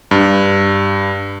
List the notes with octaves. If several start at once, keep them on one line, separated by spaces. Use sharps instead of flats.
G2